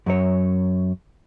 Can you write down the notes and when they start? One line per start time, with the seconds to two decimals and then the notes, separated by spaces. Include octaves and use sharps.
0.06 F#2 F#3 C#5